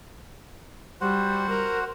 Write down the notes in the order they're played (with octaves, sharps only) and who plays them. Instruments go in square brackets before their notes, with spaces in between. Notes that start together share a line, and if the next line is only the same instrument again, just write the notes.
[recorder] G3 [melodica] F#4 C5 F#5
[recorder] A#4